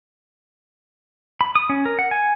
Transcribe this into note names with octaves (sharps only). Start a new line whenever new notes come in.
B5
D#6
C#4
A#4
F#5
G#5